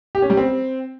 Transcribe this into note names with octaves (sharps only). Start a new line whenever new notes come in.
G4
C#4
G3
C4